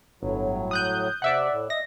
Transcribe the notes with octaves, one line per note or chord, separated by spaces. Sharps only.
G1 A2 F#3
D#6 F#6 G6
C3 D5 E5 F#5
A2
D#5 E5 A#6